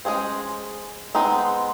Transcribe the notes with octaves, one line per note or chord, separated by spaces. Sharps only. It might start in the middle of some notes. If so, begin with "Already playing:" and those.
G#3 C#4 G#4 C5
G#3 B3 C4 D#4